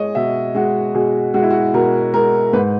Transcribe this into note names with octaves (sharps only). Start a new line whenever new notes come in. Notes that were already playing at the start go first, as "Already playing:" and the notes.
Already playing: G#3 C#5 D#5
B2 E5
G#3 F#4
B2 G#4
G#3 F#4
E4
F#4
B2 A#4
G#3 A#4
G#2 B4